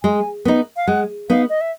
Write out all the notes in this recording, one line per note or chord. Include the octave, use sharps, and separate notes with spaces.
G#3 G#5
B3 D#4
F5
G#3 F#5
B3 D#4 F5
D#5
E5